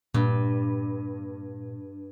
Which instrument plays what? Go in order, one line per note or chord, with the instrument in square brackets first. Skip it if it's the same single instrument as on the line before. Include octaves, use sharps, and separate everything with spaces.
[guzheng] G2 [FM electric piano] A#2